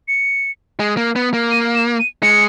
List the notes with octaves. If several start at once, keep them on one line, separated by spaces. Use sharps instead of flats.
C#7
G#3
A#3
B3
A#3
D#7
E7
D#7
G#3 C#7